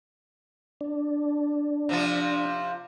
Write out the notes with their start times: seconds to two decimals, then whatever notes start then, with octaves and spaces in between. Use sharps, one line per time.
0.81 D4
1.89 C3 F3 F4